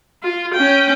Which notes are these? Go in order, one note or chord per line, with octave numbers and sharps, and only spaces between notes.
F4
C#4 G5